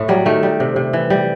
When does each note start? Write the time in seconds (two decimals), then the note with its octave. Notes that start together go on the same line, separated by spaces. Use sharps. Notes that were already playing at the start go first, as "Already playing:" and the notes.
Already playing: A2 A3
0.08 F#3 G3
0.25 D#3 A3
0.43 G3
0.60 C3
0.76 C3
0.93 E3
1.10 G3